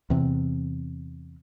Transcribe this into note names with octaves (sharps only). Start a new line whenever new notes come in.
E2 C3